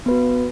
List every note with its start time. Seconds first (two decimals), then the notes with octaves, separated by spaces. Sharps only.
0.06 B3
0.08 B4
0.11 F#4